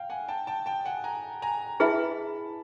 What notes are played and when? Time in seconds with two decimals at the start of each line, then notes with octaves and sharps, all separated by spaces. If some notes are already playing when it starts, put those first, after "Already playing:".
Already playing: F5 G5
0.10 F#5 G#5
0.28 G5 A5
0.47 G5 A5
0.66 G5 A5
0.85 F#5 G#5
1.04 G#5 A#5
1.42 G#5 A#5
1.80 E4 G#4 B4 E5 G5 A5 B5